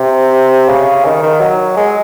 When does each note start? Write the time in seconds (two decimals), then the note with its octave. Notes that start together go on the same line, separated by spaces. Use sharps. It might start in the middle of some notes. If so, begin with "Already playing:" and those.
Already playing: C3
0.69 C#3
1.05 D#3
1.23 D#3
1.41 F#3
1.77 G#3